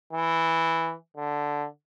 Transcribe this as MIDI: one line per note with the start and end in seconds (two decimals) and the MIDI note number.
0.13 0.95 52
1.17 1.67 50